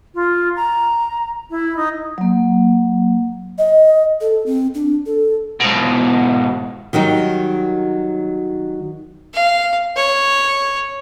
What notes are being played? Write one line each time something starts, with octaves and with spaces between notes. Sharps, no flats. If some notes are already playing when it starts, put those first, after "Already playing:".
F4
A#5
E4
D#4
F#3 A#3
D#5
A4
C4
D4
A4
G#2 B2
D#3 F#3 G3 D#4
F5
C#5